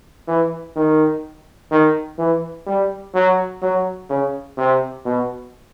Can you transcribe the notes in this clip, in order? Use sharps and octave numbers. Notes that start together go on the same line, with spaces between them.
E3
D#3
D#3
E3
G3
F#3
F#3
C#3
C3
B2